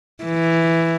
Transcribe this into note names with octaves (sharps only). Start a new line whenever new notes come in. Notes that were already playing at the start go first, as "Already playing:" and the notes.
E3